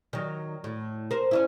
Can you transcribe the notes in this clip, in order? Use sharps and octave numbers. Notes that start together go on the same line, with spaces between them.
D#3 F#3
A2
A#4 C5
C#4 D4 E4